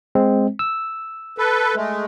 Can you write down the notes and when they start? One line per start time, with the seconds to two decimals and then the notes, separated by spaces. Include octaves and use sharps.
0.15 G#3 C4
0.59 E6
1.38 A4 B4
1.75 G#3 A3